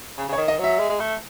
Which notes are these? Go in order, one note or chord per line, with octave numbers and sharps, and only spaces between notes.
C#3
C#3 C#5
D#3
D#5
F#3 E5
G#3
G#3
A3